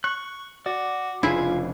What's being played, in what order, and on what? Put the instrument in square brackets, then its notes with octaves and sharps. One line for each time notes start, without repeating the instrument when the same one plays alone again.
[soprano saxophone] C#6 [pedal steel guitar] F#6
[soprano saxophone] F#4 [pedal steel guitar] D5
[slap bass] F1 C#3 D4 [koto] E4 [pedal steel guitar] F4 [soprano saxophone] G#4